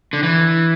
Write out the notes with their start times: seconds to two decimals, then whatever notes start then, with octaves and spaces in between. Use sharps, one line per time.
0.13 D3
0.23 E3